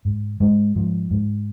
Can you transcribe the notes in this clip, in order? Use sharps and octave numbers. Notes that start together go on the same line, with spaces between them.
G#2
G#2 G#3
G#2 F3
G#2